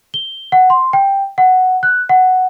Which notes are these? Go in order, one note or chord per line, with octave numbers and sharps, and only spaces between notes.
G7
F#5
C6
G5
F#5
F#6
F#5